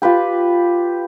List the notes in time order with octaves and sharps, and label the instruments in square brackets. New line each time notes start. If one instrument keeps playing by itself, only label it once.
[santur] F4 G4 B4 G5